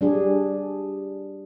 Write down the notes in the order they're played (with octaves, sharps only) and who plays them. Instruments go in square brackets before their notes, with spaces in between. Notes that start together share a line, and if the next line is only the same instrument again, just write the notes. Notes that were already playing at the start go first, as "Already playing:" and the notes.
[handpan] G3 D4 G#4